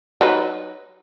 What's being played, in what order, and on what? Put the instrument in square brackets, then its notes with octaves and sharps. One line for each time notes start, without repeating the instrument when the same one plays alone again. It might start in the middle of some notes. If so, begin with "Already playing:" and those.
[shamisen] F#3 D#4 B4